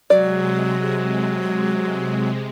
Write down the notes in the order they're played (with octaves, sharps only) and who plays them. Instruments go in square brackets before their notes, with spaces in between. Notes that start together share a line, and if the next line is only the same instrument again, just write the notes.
[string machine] C3 G#3 [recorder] F#3 [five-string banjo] D5